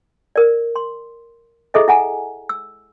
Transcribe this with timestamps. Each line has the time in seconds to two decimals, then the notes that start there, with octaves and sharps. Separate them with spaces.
0.36 A#4 D5
0.76 C6
1.74 E4 G#4 A4 D#5 E5
1.88 E4 F#5 G#5 A#5
2.49 E6